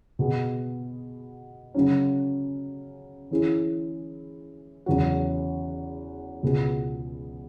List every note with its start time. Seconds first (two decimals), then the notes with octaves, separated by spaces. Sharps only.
0.19 B2 B3 G#4
1.74 C#3 F#3 C#4
3.31 E3 C#4 E4 G#4
4.86 E2 C#3 F#3 C#4 F#4
6.42 C#2 B2 B3 G#4